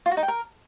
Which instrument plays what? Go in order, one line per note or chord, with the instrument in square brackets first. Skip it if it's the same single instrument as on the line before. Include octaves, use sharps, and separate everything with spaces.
[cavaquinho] F4
F#4
D#4
G5
A#4